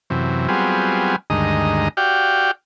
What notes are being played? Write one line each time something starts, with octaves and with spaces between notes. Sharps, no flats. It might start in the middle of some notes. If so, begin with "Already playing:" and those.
F#2 C3 E3
F#3 G3 B3 C4 F4 G#4
D2 G2 D#3 G#3 D#5 A#5
F#4 G4 D5 F5 G5